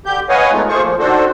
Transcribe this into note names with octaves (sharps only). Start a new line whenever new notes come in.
D3 G4 G6
B4 C#5 D#5 F5 F#5 G#5
G#3 A3 B3 D#4 F4
A3 A#3 F4 G#4 C5 C#6
A#2 F3
D#3 D4 F#4 A4 C5